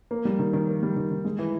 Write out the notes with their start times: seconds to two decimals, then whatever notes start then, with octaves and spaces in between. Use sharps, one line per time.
0.11 A#3
0.25 G3
0.39 D#3
0.53 D#3
0.68 A#3
0.83 G3
0.97 D#3
1.11 D#3
1.25 G#3
1.39 E3